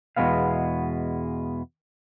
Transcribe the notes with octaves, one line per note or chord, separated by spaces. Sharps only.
E2 B2 G3 G#3 B3 F5